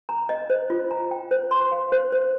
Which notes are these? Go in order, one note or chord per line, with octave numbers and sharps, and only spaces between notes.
A#5
D#5
C5
F4
A#5
G5
C5
C6
F5
C5
C5